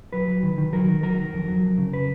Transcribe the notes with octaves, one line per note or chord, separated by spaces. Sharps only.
F#3 B4
F#3
D#3
D#3
F#3 A#4
D#3
F#3 A#4
D#3
F2
F#3
F2
C#3
B4